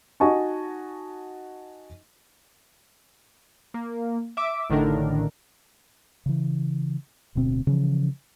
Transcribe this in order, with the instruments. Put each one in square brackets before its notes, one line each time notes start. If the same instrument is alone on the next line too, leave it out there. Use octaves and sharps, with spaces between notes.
[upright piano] D#4 F#4 D#5 G#5 A5 C#6
[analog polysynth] A#3
E5 D6
A1 A2 D3 D#3 D4 A#4
[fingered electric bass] C#3 E3
D1 D2 B2 C4
C#3 E3 F3